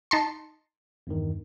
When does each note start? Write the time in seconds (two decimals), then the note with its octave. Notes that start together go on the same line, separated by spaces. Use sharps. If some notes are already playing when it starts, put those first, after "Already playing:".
0.11 D#4 A5 C6
1.07 E2 G2 D#3